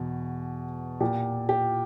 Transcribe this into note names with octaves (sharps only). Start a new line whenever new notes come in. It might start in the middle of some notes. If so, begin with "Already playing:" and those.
Already playing: E2 B2
A#2 G4
G4